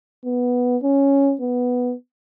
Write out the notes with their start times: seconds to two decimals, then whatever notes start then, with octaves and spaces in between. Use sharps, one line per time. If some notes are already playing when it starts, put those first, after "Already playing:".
0.25 B3
0.83 C#4
1.41 B3